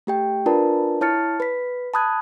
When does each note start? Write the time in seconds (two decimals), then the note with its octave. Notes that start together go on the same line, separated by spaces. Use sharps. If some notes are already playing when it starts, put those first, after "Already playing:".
0.07 A3 G4 G5
0.46 D4 F4 A#4 B4 D5 A5
1.01 E4 C#5 A5 F6 A6 C#7
1.40 B4 B6
1.94 A5 B5 D#6 F#6 G#6